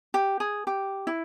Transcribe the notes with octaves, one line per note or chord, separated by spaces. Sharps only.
G4
G#4
G4
E4